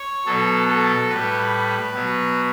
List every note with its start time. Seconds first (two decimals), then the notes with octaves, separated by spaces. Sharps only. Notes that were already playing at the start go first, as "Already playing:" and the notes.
Already playing: C#5
0.26 B2 F#3 A4
0.68 A4
1.09 A2 G3 B4
1.93 B2 F#3